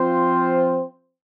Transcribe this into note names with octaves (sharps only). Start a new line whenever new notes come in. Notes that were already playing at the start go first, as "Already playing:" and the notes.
Already playing: F3 C4 F4 C5